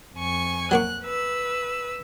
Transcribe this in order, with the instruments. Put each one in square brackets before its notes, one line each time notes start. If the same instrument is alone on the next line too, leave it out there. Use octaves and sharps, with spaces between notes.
[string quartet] F2 G#5 C#6
[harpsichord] F#3 A#3 C#6 [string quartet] F#6
[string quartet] B4 E6